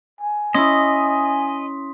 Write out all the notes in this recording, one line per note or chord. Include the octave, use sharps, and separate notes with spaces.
G#5
C#4 E4 D#5 C6 D#6 B6